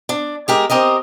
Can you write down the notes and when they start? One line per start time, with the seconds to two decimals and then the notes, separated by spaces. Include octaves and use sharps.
0.09 D4
0.48 G#3 G4 A#4
0.70 C4 G4 A#4 D#5